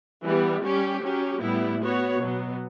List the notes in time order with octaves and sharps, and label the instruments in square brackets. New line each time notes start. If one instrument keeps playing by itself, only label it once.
[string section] E3 G3 B3
G3 C#4 G4
F#3 C#4 G4
A2 G3 B3 E4
B3 F#4 C#5
B2 F#3 B3